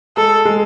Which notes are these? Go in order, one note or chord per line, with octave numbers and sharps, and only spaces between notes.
G#3 A4
G#3